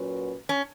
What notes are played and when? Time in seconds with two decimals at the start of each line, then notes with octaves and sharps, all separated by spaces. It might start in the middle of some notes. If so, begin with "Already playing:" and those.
Already playing: A#2 F#3 C#4 F#4 B4
0.49 C#4